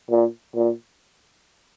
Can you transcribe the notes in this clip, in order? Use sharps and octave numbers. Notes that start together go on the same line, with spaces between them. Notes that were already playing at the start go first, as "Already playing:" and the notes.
A#2
A#2